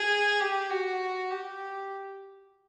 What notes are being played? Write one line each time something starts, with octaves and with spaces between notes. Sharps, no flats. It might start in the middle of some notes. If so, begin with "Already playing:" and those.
Already playing: G#4
G4
F#4
G4